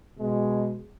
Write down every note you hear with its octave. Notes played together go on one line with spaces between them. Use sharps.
B2 G#3